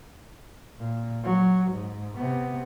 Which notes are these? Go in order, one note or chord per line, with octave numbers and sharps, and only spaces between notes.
A#2
F#3
G#2
C3 B3